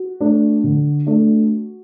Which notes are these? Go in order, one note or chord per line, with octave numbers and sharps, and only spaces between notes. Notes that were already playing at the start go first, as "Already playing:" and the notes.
Already playing: F#4
A3 D4
D3
A3 D4